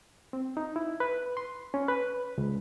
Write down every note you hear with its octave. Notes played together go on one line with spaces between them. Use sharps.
C4
D#4
E4
B4
C6
C#4
B4
C#2